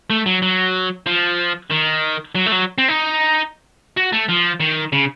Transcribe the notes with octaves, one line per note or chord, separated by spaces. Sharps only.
A3
F#3
F#3
F3
D#3
F#3
A3
F#3
C4
D#4
F#4
A3
F3
D#3
C#3